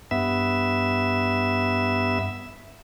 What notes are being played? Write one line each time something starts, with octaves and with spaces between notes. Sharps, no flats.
G2 B3 E5